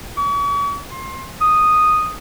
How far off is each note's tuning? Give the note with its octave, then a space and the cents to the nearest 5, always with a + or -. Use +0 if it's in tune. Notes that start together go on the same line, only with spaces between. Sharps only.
C#6 +45
C6 +25
D#6 -5